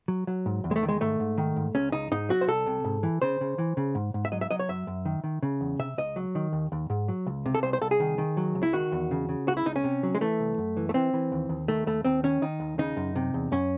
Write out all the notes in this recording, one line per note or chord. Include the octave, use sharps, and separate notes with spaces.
F#3
F#3
G#2
E2
G#3
A3
D#3
G#3
G#2 A3
G#2
D#3
G#2
C#2 C#4
C#2 D#4
G#2 D#4
F#3 F#4
C5
C2 A4
C3
G#2
E3
C#3 C5
C#3
E3
C#3
G#2
G#2
E5
F#3 D#5
E5
F#3 D#5
C#5
F#2 E5
F#2
D#3
D#3
C#3
E2
C3 E5
C#2 D#5
F#3
D#3
D#2
D#2
G#2
F#3
C#2
C3
A4
C2 C5
C5
C2 A4
G#4
D#3
D#3
F#3
C#2
E4
D#3 F#4
E2
C#3
C#3
C#2 F#4
E4
C#2 D#4
C#4
C3
F#3
G#3
E3 A3
C2
F#2
E3
A3
E3 C4
E3
D#2
D#2
D#3 A3
D#2 A3
D#2 C4
D#3 C#4
D#3 D#4
D#2
C#3 D#4
F#2
C3
E2
F#2 C#4